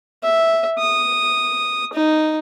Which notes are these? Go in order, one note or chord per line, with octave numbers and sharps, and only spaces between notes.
E5
D#6
D#4